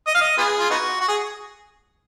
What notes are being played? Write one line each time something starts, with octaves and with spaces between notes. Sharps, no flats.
D#5
F5
D#5
B3 F4 G#4
F4
B3 D#4 F#4
F#4
G#4